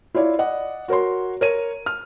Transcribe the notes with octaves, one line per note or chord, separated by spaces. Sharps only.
E4 F4 C#5 D5
D5 D#5 F#5
F#4 A#4 C#5 C6
A#4 C#5 D#7
F6